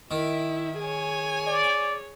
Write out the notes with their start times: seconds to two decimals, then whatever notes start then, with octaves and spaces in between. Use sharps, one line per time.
0.11 D#3 E4 E5
0.80 G#4 C#5 G#5
1.47 D5